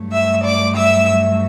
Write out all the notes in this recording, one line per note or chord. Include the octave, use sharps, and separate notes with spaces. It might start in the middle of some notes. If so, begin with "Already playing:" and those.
Already playing: G2 F#3 A3
E5 E6
D5 D6
E5 E6